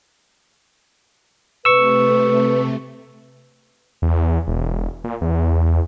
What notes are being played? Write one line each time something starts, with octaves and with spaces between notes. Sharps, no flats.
C3 A3 B4 C#6 E6
E2
E1
A#2
E2